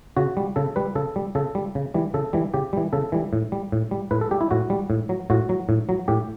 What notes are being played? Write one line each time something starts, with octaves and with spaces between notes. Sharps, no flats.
C#3 F#4
G3
C#3 A4
G3 B4
C#3 A4
G3
C#3 A4
G3
C#3
E3 G3
C#3 A4
E3 G3
C#3 G4
E3 G3
C#3 A4
E3 G3
A2
G3
A2
G3
A2 B4
A4
G3 G4
E4
A2 F#4
G3
A2
F#3
A2 F#4
F#3
A2
F#3
A2 G4